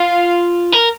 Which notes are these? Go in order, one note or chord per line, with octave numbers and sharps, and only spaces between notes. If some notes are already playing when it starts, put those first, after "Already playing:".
Already playing: F4 F5
A#4